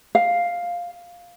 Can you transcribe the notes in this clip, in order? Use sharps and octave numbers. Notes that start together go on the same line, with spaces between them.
F5